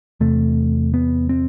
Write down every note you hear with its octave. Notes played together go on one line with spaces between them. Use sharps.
E2 C3 A3
B3
C4